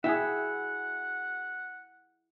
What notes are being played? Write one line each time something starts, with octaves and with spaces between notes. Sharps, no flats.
E4 F#4 G#4 E5 F#5 G5